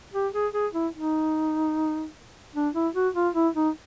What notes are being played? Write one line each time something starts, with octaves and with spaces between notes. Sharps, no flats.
G4
G#4
G#4
E4
D#4
D4
E4
F#4
F4
E4
D#4